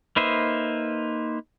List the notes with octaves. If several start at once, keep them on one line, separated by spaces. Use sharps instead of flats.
A#3 D#4 B4 C5 E5